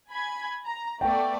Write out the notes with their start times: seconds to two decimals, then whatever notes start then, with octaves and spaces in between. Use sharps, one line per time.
0.10 G#5 B5 G#6
0.65 A#5
1.01 A3 B3 D5 G5